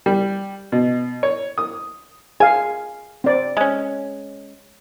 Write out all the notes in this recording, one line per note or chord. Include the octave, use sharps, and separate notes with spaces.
G3
B2
C#5
D#6
G#4 F5 G#5
C4 D5
G#3 C#4